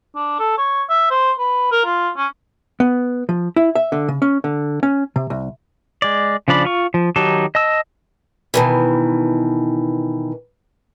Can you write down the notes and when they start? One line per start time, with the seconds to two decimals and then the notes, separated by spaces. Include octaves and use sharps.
0.15 D4
0.39 A4
0.58 C#5
0.90 E5
1.11 C5
1.39 B4
1.71 A#4
1.85 F4
2.17 C#4
2.80 B3
3.29 F3
3.56 E4
3.75 E5
3.92 D3
4.08 C#3
4.22 C#4
4.44 D3
4.83 C#4
5.16 C3
5.30 C2
6.02 G#3 D5
6.48 C#3 F3 D4 D5 B5
6.65 F4 C#6
6.94 F3
7.16 D#3 F#3 D#4 G4 A5
7.55 D#5 A5 E6
8.54 B2 D#3 E3